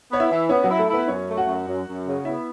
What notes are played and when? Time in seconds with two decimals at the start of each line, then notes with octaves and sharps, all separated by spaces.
0.10 B3 C#5
0.20 E4 E5
0.30 E3
0.49 B3 C#4 C#5
0.63 F#3 F#4
0.69 E4
0.79 A3 A4
0.89 B3 E4 B4
1.07 F#2 C#4 C#5
1.28 A3
1.37 F#4 F#5
1.46 F#2
1.66 F#2
1.86 F#2
2.06 C#3
2.25 B3 E4 E5